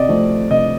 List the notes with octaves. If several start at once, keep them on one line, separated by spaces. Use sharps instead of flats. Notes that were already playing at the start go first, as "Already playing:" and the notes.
Already playing: C3 D5 D#5
F3 A3 C4
C3 D#5